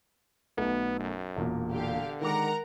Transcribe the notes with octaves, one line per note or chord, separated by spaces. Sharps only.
B1 B2 A3 B3
F#2
E1 A#2
D3 G4 F5
D#3 G#3 A#4 F#5 A#5 D6